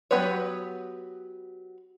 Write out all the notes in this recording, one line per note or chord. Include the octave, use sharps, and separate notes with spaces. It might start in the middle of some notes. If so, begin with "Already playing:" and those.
F#3 B3 G4 B4 C#5